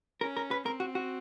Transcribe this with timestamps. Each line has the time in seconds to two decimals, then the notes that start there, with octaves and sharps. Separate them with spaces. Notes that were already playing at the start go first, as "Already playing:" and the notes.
0.21 C#4 A#4
0.37 A#4
0.51 B4
0.66 C4 A#4
0.80 F#4
0.95 F#4